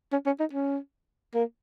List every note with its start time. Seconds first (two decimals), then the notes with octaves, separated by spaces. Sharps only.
0.12 C#4
0.26 C#4
0.40 D#4
0.53 C#4
1.34 A#3